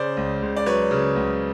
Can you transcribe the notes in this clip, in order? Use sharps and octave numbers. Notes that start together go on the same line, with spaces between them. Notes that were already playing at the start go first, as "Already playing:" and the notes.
Already playing: C#3 C5 D5
C#2
C#2
D5
F#3 B4 C#5
C#3
C#2